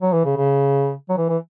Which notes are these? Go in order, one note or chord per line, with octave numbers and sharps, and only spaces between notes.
F#3
E3
C#3
C#3
F#3
E3
E3